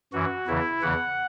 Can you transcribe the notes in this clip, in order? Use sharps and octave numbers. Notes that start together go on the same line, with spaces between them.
F#2 E3 F#4
E2 C#3 E3 E4
E2 C#3 E3 F#5